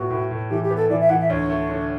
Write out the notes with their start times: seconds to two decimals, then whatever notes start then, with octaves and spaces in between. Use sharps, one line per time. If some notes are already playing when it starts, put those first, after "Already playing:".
Already playing: A2 B3 F#4
0.10 A2
0.31 A2
0.50 E3 G4
0.63 G4
0.71 B3
0.76 A4
0.90 E3 D5
1.01 E5
1.10 E3 F#5
1.20 E5
1.30 D2 C#5
1.50 A3
1.69 D3